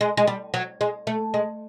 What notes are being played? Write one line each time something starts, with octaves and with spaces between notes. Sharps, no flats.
G#3
G#3
G3
F#3
G#3
A3
G#3